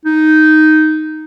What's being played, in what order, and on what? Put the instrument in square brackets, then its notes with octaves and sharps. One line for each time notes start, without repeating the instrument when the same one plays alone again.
[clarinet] D#4